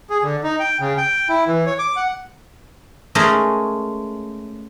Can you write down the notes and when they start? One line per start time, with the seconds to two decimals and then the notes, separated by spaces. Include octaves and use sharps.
0.10 G#4
0.23 D3
0.44 D#4
0.59 G5
0.80 C#3
0.97 G5
1.29 E4
1.47 E3
1.66 C#5
1.79 D6
1.96 F#5
3.15 G#3 A3 C#4 G#4 A#4